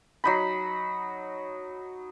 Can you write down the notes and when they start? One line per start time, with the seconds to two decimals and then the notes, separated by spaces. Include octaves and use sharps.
0.24 F#3 D#4 B5